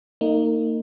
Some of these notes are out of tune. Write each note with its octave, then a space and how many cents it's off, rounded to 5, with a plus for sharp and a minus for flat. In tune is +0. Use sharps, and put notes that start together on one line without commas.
A#3 -35 D#4 +0